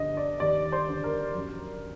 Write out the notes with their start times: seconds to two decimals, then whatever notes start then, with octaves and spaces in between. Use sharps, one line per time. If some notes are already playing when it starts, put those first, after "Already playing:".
Already playing: G2 D3 D#5
0.17 D5
0.40 D#2 D5
0.72 C5
0.88 D3
1.04 A#4
1.35 F#2